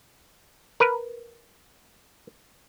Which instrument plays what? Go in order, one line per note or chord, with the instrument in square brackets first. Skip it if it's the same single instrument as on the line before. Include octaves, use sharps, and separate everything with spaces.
[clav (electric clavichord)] A#4 B4